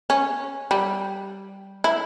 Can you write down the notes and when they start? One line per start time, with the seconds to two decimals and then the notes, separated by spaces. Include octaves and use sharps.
0.10 C#4
0.71 G3
1.84 E4